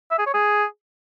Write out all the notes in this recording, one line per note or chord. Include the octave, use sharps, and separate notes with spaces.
E5
G#4
C#5
G#4